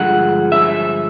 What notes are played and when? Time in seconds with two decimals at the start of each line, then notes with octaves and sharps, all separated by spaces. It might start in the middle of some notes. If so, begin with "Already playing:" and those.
Already playing: G2 D3 F3 G#3 F#5
0.52 E5